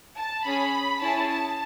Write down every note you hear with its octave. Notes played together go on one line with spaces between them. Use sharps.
A5
C#4 G#4 B5
C#4 E4 G#4 A5
A5